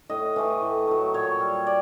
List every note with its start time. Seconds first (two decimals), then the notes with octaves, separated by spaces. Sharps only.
0.10 A2 D#5
0.36 E3 A3
0.62 A2
0.87 F#3 A3
1.14 A#2 C#5
1.40 G3
1.67 D5